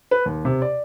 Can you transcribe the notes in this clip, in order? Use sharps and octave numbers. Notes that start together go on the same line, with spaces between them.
B4
D#2
C3
D5